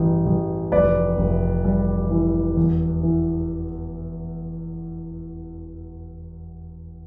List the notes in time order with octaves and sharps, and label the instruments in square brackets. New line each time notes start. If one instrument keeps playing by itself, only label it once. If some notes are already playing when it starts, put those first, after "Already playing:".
Already playing: [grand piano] A1 G2
A1
F1 B4 D5
F1
G3
E3
E2
E3